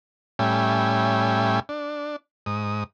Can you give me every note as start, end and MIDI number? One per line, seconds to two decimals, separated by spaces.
0.39 1.60 45
0.39 1.60 55
0.39 1.60 61
0.39 1.60 76
0.39 1.60 79
0.39 1.60 80
1.69 2.16 62
2.46 2.84 44
2.46 2.84 87